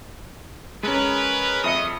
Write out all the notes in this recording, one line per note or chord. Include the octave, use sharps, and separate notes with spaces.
G#3 C#4 A#4 B4
F2 D#5 E5 D#6 C#7